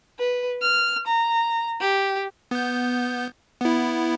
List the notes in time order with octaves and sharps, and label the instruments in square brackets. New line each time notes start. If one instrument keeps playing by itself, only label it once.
[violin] B4
F6
A#5
G4
[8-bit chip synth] B3 G6
B3 E4